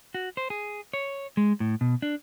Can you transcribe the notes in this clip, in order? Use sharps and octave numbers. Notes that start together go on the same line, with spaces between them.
F#4
C5
G#4
C#5
G#3
A2
B2
D4